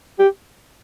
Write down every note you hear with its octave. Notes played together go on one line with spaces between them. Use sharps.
G4